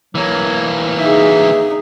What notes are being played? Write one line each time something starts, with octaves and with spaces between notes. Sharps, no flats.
E3 F#3 A#3
D#4 G#4 E5